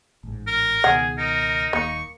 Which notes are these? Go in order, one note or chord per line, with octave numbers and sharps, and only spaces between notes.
A1 G#2
A#4
C#2 B2 D#3 G#4 F#5
D#4 A#4
D#1 D#2 A#3 C#6